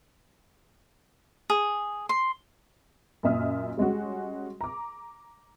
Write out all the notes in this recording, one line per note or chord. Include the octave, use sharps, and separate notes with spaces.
G#4
C6
F#2 A#2 D#5 E5 D#6 F6
G3 G#3 C#4 F#4
A#5 D6